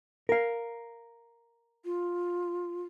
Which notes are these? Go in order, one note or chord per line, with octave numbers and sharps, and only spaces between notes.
A#4 F5
F4